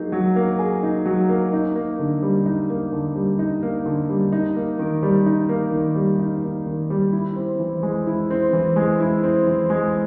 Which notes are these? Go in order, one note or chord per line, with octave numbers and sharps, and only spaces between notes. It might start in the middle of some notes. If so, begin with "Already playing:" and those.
Already playing: F#3 A#3 D#4 G#4
F#3
A#3
G#4
D#4
F#3
A#3
D#4
A#3
D3
G3
D#4
A#3
D3
G3
D#4
A#3
D3
G3
D#4
A#3
D#3
G3
D#4
A#3
D#3
G3
D#4
A#3
D#3
G3
E4
C4
E3
G#3
E4
C4
E3
G#3
E4
C4
E3
G#3